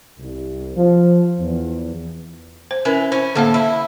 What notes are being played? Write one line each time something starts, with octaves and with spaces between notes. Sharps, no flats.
C2
F3
E2
C5
E3 C#4 A#4
C#4 E4 C5
A2 D3 A#3 A4 F5
E4